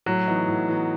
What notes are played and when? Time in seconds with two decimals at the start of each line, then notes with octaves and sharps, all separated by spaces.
0.06 A2 F#3
0.27 E3 B3 D#4
0.48 A2
0.68 E3 B3 D#4